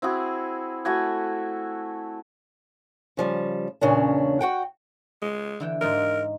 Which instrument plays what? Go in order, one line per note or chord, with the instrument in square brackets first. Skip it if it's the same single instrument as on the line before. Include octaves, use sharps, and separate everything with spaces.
[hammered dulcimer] C4 E4 F#4 G#4
A3 E4 F#4 G#5
[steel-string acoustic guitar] C#3 F3 G3
E2 A#2 C#3 C#4 D4
F#4 F#5 G5
[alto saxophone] G#3
[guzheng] D3 E3 G5
[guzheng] G#2 D#4 F4 [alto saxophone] A#4